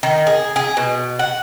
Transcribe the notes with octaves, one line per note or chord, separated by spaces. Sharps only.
D#3
G#4
G#4
B2
F#5